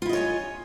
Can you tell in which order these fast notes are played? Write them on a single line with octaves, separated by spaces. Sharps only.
F4 E4 D#5 C#5 G#5